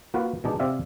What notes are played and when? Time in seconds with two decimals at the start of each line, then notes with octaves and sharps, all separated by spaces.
0.14 A#3 F4 F#4 B4
0.44 B2 G#3 D4 D#4
0.59 C3 C4 D5 E5 F5